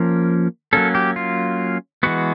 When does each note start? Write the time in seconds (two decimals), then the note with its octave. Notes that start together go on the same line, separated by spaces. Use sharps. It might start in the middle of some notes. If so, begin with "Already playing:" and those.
Already playing: F3 A#3 C#4 A#4
0.73 F#3 A#3 C#4 A4
0.95 G4
1.16 F4
2.03 E3 G#3 B3 F#4